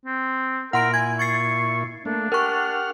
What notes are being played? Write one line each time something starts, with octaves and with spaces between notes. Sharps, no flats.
C4
A#2 E4 A#4 F#5 C6 D7
G#5 G#6
C#6 G#6 A6 C7
A3 A#3 D4
G4 A#4 F#5 C#6 F6